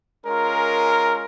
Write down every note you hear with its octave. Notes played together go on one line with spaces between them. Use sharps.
G#3 C#4 F4 A#4